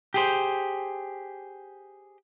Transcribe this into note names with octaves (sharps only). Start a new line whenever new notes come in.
G4 G#4 C5